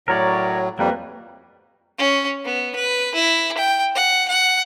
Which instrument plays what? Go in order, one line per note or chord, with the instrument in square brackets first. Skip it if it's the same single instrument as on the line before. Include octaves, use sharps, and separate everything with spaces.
[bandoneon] A2 F#3 [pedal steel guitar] A#4 C#5 D5
[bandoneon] F2 G3 [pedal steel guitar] A#3 B4
[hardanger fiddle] C#4
B3
B4
E4
G5
F#5
F#5